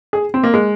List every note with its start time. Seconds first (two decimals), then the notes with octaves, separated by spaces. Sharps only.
0.13 G#4
0.34 C4
0.44 A#3
0.54 G#3